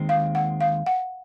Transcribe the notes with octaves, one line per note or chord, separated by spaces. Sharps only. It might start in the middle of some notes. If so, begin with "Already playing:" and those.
Already playing: D#2 D#3 G#3 C4
F5
F#5
F5
F#5